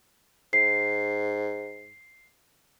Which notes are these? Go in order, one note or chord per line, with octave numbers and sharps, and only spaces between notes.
G#2 C7